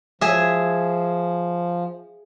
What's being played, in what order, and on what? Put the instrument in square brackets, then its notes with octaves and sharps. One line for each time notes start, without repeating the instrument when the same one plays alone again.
[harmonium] F3 [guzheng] G#4 E5